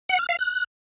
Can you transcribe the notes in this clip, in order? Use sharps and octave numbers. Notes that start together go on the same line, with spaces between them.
F#5
F6
F5
F#6